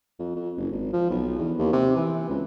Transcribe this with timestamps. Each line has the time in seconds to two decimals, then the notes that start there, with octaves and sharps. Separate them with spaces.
0.19 F2
0.36 F2
0.57 F#1
0.71 G#1
0.93 F3
1.10 B1
1.38 E2
1.58 D#2
1.73 C3
1.96 E3
2.30 C#2